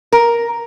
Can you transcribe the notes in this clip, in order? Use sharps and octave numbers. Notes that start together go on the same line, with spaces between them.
A#4